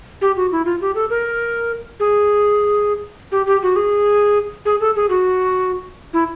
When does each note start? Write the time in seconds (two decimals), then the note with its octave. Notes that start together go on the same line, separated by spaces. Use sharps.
0.21 G4
0.36 F#4
0.52 E4
0.65 F4
0.81 G4
0.95 A4
1.10 A#4
2.00 G#4
3.32 G4
3.47 G4
3.63 F#4
3.76 G#4
4.65 G#4
4.80 A4
4.96 G#4
5.09 F#4
6.13 E4